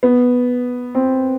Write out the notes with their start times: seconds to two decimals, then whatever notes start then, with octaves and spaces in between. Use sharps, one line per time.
0.03 B3
0.95 C4